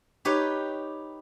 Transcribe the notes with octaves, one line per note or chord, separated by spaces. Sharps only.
D#4 G4 B4 C#5